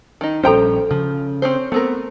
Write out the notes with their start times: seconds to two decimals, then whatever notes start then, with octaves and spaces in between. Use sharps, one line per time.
0.21 D#3 D#4
0.43 A#1 G3 C#4 F#4 A4 C5 G5 A#5
0.91 C#3 F3
1.42 C4 C#4 C5
1.72 A3 B3 C4 A#4